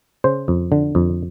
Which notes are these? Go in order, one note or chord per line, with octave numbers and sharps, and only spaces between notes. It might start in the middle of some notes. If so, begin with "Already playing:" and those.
C#3 C5
F2
D3
F2